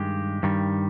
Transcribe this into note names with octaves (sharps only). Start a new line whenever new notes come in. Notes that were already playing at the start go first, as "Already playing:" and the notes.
Already playing: G2 D#3 G#3 G4
G2 D#3 G3